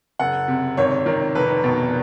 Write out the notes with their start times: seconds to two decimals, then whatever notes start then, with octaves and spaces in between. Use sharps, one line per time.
0.19 F#1 F#5
0.48 C3
0.77 G#1 C#5
1.06 D#3
1.35 F1 B4
1.64 B2